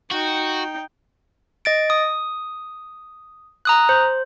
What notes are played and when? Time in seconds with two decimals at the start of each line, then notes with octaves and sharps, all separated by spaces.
0.11 D#4 F#4 G5
1.65 D#5 A6 D7
1.90 D#6
3.65 A#5 D#6 F#6
3.89 C5